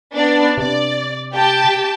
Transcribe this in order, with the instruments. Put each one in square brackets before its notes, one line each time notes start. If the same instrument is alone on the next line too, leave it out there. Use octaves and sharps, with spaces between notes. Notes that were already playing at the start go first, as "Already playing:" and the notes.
[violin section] B3 D4 D5
[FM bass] C3 [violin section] D5
[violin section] G4 G5 A5